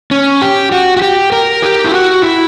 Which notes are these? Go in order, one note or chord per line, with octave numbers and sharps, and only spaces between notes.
C#4
G4
F#4
F#4
G4
A#4
G4
E4
F#4
E4